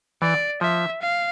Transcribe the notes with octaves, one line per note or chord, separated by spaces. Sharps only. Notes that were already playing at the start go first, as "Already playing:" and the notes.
E3 D5
F3 E5
F5